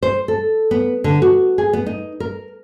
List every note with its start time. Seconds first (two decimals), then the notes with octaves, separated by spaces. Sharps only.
0.03 C5
0.28 A4
0.71 B3
1.04 D3
1.22 F#4
1.58 G#4
1.73 B3
1.86 D#4
2.20 A#4